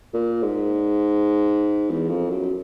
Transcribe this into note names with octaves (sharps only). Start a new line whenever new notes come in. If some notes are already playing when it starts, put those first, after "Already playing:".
A#2
G#2
E2
F2
F#2